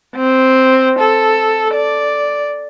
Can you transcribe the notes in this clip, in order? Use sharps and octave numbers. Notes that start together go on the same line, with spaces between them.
C4
A4
D5